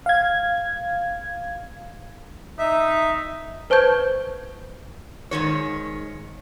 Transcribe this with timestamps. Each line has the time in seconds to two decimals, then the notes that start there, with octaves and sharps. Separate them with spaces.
0.06 F5 G#6
2.59 D#4 E5
3.70 B4 C5 A5 C#6 G6 G#6
5.31 G#2 C3 D#3 C#5